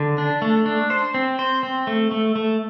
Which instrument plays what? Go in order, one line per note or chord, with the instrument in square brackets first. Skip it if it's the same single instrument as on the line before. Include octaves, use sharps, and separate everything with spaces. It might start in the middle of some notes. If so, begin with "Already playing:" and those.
Already playing: [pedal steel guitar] D3
D4
A3
D4
C5
C4
C5
C4
A3
A3
A3